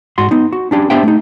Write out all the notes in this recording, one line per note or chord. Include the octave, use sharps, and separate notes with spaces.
G#2 F#4 C6
B3 D#4
F#4
C#4 D4 G4
B3 D4 G4 C5 E5 G5
A3 D#4